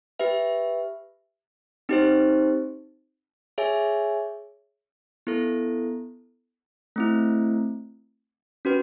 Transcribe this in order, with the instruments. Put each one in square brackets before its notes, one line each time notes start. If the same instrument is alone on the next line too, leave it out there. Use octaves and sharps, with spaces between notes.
[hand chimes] G4 B4 E5
C4 D#4 G4 C5
G#4 C#5 E5 G#5
B3 E4 A4
A3 C4 E4
C#4 F#4 B4